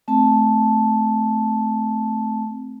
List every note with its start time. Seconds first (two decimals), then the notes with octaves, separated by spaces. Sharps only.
0.08 A3 C4 A5